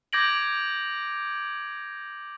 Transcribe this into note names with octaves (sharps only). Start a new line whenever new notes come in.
D6 G6 G#6 A#6 D7 F#7